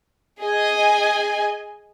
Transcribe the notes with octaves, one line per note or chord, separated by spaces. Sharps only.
G#4 D#5 G#5